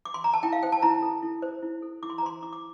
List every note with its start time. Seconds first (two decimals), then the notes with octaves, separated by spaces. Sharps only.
0.05 D6
0.14 C6
0.24 A#5
0.33 A5
0.43 E4 G5
0.53 F5
0.63 C5 G5
0.72 A5
0.82 E4 A#5
1.02 A4
1.23 E4
1.42 C5
1.63 E4
1.82 A4
2.03 E4 D6
2.10 C6
2.18 A#5
2.22 C5 C6
2.42 E4 D6
2.53 D6